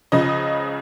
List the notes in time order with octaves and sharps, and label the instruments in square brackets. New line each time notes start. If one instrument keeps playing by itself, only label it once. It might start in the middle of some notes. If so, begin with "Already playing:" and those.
[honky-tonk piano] C#2 C#3 F3 D#5